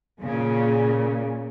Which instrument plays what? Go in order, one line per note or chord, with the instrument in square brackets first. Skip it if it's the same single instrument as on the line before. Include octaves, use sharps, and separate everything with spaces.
[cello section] A#2 C#3